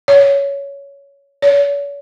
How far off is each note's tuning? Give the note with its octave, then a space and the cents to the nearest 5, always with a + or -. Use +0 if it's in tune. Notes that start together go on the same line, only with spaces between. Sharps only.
C#5 +10
C#5 +40